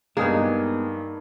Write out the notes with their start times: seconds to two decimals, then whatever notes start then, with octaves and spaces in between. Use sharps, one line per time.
0.17 G2 G#3 A#3 B3 D#4 G4 G#4 G#6